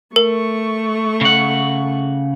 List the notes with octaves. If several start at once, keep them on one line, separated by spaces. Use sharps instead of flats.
A3 A#4 C#6
C#3 F#5